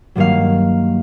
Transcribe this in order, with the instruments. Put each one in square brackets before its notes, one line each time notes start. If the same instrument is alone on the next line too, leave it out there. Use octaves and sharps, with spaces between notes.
[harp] G2 D#3 F#3 A#3 F5